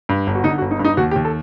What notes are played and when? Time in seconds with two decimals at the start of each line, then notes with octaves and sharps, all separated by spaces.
0.09 G2
0.27 G1
0.35 F#4
0.44 D3 D#4
0.58 F#4
0.62 G1
0.71 D#4
0.79 G2
0.85 D#4
0.97 D#2 F#4
1.11 G4
1.16 D#2
1.25 A4